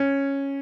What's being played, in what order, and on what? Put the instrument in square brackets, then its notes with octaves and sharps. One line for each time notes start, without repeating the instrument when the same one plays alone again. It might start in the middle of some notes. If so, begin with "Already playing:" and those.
Already playing: [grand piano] C#4